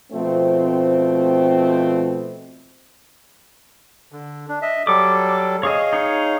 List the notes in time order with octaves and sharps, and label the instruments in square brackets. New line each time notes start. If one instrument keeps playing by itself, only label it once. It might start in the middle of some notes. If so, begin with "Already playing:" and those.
[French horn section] B2 F3 A3 C4
[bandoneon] D3
D4
D#5 E5
[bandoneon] F#3 G3 A4 [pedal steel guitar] D6
[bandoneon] G#4 F5 [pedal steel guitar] C#5 D#5
[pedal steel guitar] D#4 C#5